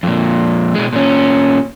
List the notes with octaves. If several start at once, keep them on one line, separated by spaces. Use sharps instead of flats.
F2 A#2
B2 G#3
A#2 C#4